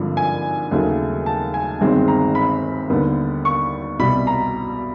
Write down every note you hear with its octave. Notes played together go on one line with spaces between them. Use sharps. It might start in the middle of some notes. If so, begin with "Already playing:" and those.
Already playing: G#1 G2 D3 F3
G#5
D#2 C#3 F#3 A3
A5
G#5
G1 G2 D#3 G#3 C4
A#5
B5
D#2 D3 G3 B3
C#6
C2 B2 G3 B5
A#5